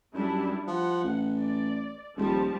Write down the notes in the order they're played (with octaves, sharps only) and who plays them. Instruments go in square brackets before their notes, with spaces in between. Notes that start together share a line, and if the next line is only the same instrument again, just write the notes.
[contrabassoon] F#2 [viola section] G3 D4 E4
[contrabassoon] F3 [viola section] F#5
[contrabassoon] A1
[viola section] D5
[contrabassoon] D#1 [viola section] F3 G3 A5